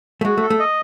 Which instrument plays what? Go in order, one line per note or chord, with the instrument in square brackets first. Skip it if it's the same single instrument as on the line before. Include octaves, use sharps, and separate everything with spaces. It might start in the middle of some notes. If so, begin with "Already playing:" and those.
[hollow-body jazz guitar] A3
[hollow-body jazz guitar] G#3 [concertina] F#4
[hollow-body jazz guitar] A3
[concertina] A4
[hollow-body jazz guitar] A3
[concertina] D#5